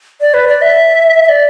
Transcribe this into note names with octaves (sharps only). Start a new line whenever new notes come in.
D5
B4
D5
E5
E5
D5